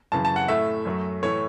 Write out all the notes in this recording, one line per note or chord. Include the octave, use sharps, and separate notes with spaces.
F#2 C#3 E3 A5
A5
F#5
A2 A3 E5
F#2 F#3 A3
A2 E3 A3 C#5